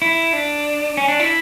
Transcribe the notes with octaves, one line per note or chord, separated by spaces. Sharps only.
E4
D4
C#4
D4
E4